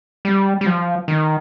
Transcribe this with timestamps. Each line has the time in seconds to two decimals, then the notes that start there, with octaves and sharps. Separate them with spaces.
0.25 G3
0.61 G3
0.66 F3
1.08 D#3